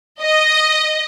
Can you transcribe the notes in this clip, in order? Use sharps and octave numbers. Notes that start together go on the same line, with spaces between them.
D#5